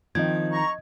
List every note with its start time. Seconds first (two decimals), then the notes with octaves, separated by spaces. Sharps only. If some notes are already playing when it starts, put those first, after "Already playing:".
0.15 D#3 F3 C4 D#5 G#6
0.51 A#5 C#6